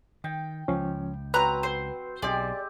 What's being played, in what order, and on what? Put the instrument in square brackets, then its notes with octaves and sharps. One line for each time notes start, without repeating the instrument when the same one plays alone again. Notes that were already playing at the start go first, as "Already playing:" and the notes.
[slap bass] D#3 [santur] G5
[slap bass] C#2 [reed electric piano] F3 C#4
[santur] F#3 C4 [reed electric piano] B4 [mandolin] A#5 F#6
[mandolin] C5
[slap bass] B1 B2 [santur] G#3 C4 G4 [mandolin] D5